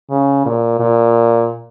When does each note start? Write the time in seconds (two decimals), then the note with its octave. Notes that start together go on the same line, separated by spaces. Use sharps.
0.10 C#3
0.46 A#2
0.80 A#2